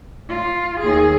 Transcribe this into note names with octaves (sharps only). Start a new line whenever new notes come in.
F4
D#2 G#4